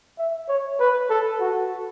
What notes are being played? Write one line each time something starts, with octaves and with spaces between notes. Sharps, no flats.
E5
C#5
B4
A4
F#4